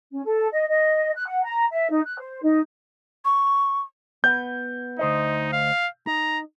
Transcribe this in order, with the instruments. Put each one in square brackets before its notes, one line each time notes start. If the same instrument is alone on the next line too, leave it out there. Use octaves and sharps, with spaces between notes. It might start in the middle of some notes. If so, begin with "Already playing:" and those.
[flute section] C#4
A4
D#5
D#5
F#6
F#5
A#5
E5
D#4
F#6
C5
D#4
[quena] C#6
[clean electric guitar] B3 [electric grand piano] G6
[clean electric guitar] D2 C5 D#5 [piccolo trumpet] D#4
[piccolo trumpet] F5
[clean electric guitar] D#4 [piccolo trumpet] A#5